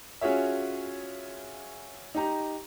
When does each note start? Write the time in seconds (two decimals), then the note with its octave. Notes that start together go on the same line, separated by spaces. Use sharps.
0.21 C#4 F4 F#4 G#4 C#5 E5
2.15 D#4 G4 A#5